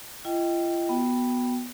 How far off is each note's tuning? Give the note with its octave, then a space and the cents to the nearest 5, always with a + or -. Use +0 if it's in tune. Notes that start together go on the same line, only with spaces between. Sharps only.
F4 -40 D#5 +20 G5 +0
B3 -5 F#4 +0 G5 +0